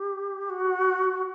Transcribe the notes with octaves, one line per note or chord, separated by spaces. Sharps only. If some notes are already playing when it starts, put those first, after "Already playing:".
Already playing: G4
F#4